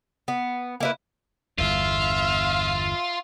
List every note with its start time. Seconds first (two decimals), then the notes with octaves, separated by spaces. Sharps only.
0.28 B3
0.80 A#3 E4 B4
1.58 G1 E2 F4 E5 F5